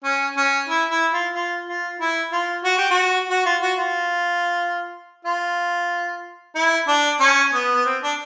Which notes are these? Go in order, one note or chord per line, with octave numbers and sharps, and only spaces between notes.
C#4
C#4
E4
E4
F4
F4
F4
E4
F4
F#4
G4
F#4
F#4
F4
F#4
F4
F4
E4
D4
C#4
B3
B3
C4
D4